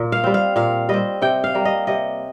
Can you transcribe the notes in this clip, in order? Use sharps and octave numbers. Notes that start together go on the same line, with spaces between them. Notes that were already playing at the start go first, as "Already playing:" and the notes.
Already playing: A#2
F5
G3 C4
F5
A#2 F5
G3 C4 D#5
C3 G5
F5
G3 A#3
D#5
C3 D#5